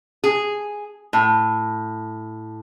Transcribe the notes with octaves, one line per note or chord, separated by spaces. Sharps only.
G#4
A2